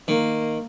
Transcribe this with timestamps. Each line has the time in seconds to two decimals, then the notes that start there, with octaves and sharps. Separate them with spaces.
0.08 D#3 A#3